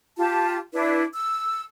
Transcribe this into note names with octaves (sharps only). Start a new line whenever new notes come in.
F4 G4 A5
D4 E4 B4
E6